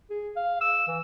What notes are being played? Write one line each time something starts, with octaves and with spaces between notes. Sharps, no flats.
G#4
F5
E6
E3